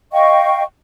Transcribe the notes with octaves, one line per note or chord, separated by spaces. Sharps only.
D#5 F5 G5 C#6